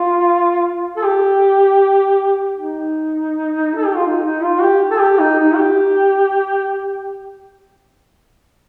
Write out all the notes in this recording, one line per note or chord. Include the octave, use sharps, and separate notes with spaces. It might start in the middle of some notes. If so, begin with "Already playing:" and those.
Already playing: F4
A4
G4
D#4
A4
G4
F4
D#4
D#4
F4
G4
A4
G4
D#4
D#4
G4